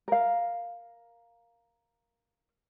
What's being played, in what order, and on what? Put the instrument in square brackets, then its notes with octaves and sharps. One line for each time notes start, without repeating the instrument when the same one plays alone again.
[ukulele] A#4 F5